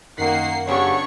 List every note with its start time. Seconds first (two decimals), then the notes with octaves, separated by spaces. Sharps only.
0.18 F#2 D#3 A#3 F#5 C7
0.67 C#3 F#3 B3 D4 G4 C#5 C#6